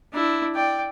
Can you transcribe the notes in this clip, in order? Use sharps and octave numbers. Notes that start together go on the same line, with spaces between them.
D4 E4
D5 G5